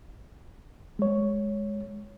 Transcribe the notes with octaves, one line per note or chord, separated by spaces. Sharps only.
G#3 C#5